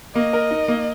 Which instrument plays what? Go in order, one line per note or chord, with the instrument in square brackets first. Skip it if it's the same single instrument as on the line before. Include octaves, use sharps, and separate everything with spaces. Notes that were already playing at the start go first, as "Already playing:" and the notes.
[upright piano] A#3 [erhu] D#5
[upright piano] A#4
D#4
A#3